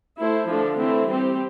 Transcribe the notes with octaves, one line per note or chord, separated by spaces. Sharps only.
A3 E4 A4 C5
D3 F3 A3 D4 A4
E3 A3 C4 E4
G3 C4 G4